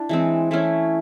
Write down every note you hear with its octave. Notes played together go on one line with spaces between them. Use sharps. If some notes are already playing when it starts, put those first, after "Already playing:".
Already playing: D4 E4
E3 G#3 C4
E3 A3 C#4 E4